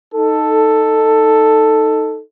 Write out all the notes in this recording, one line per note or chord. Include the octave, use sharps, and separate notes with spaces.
D#4 A4